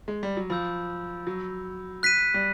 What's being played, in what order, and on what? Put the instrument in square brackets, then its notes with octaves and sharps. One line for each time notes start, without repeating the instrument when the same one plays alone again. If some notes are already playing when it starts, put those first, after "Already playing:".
[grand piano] G#3
G3
F#3
[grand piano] F3 [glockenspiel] B5 E6 G6
[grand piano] F#3
[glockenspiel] F#6 B6 D#7
[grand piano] G3